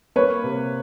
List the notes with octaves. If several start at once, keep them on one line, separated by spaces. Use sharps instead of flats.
A#3 B4 C#5
C3